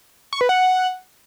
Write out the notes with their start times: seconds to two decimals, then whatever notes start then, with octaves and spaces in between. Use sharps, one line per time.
0.33 C#6
0.41 B4
0.49 F#5